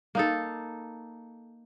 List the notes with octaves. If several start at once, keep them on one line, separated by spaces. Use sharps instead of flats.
A#3 D#4 A4